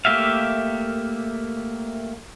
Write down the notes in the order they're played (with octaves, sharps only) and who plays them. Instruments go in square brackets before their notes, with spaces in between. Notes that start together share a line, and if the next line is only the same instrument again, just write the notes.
[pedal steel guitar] A3 A#3 G4 E5 F5